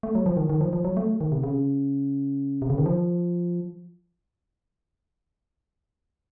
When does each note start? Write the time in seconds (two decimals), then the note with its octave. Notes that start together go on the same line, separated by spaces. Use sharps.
0.03 A3
0.15 F#3
0.26 F3
0.37 D#3
0.50 D#3
0.61 F3
0.73 F3
0.84 F#3
0.97 A3
1.21 D#3
1.32 C3
1.44 C#3
2.62 C3
2.70 C#3
2.78 D#3
2.86 F3